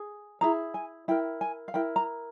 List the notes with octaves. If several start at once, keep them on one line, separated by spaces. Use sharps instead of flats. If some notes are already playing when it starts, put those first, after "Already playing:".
Already playing: G#4
E4 G#4 A#5
G#5
E4 A#4 G5
G#5
F5
E4 A#4 G5
A#5